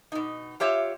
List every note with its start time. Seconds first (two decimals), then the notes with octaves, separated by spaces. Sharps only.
0.12 B2 D#4
0.60 F4 G4 C#5 E5